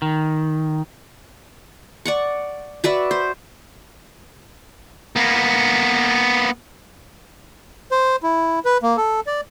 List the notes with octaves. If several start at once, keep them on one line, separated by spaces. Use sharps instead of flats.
D#3
D5 F#5 C#6
F#4 B4 D5 E5
C5
A#3 B3
C5
E4
B4
A#3
A4
D5